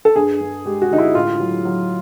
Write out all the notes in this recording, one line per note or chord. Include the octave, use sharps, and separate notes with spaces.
A4
G2 G#4
G2
G#3 G4
F#4
D3 D#4
E4
A2 F4
F#3
F#3